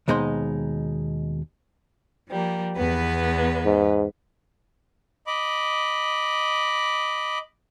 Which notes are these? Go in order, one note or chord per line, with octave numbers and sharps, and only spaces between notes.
D#2 B2 G#3 D#4 C5 C6
F3 G3 A#3
E2 B3 B4
G#2
D#5 B5 D6